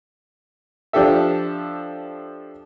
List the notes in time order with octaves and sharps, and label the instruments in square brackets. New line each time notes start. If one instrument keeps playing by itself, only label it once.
[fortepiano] F3 D4 G4 A4 E5